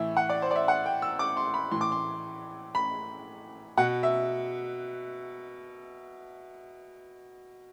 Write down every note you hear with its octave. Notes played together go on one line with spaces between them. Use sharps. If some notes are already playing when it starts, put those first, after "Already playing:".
Already playing: A2 E3 E5
F#5
D5
C5
D5
E5
F#5
G5
E6
D6
C6
B5
A2 E3 C6
D6
C6
B5
B2 F#5
E5